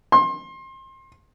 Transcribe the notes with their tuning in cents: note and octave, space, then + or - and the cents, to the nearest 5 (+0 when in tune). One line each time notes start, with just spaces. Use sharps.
C6 +30